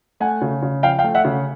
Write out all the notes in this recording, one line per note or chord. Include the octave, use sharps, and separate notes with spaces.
A3 F#5 G#5
C#3
C#3
F3 F5 G5
F5 G5
A3
E5 F#5
C#3